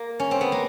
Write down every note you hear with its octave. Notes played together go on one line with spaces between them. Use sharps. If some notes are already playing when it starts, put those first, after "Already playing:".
Already playing: A#3
C#4
C4
B3
A#3